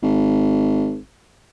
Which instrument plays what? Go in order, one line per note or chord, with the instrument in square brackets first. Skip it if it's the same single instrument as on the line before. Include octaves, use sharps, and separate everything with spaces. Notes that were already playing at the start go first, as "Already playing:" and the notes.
[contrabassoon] G#1